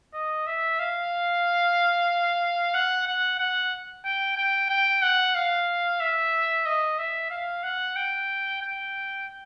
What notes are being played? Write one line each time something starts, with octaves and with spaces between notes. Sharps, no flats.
D#5
E5
F5
F#5
F#5
F#5
G5
G5
G5
F#5
F5
E5
D#5
E5
F5
F#5
G5
G5